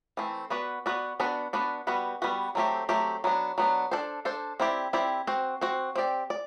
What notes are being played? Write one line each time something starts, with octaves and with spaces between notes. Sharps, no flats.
E3 A3 C4
B3 F#4 B4 D5
B3 F#4 B4 D5
B3 D4 F#4 B4 D5
B3 D4 F#4 B4 D5
G3 B3 F#4 B4
G3 B3 F#4 B4
F#3 A3 C4 G4
F#3 A3 C4 G4
F#3 B3 D4
F#3 B3 D4
D4 A4 C5
D4 A4 C5
C4 E4 G4 D5
C4 E4 G4 D5
C4 F#4 C5
C4 F#4 C5
C4 G4 D5
D5